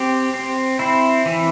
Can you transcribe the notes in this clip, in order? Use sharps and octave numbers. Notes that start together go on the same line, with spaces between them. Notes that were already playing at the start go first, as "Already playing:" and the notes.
Already playing: C4 G4
C4
C4 E4
E3